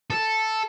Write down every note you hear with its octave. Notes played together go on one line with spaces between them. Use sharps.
A4